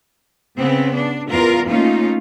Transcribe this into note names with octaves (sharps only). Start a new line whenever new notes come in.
C#3 B3 C4
D4
E2 F4 A#4
A3 A#3 C#4 D#4 F4